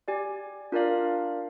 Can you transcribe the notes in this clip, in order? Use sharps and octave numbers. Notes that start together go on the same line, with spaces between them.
G4 D5 G#5
D4 F4 A#4 D5 F5